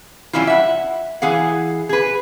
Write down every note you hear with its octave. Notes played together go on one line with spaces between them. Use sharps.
E3 G3 C4 C#4 E4 F4
E5 F#5
E3 G#4 F5 F#5
G#4 B4